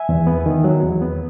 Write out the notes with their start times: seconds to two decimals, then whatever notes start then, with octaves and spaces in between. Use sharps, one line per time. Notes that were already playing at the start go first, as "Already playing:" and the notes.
Already playing: E5 G#5
0.09 E2
0.27 B3
0.46 D#3
0.64 F#3
0.83 E2
1.02 B3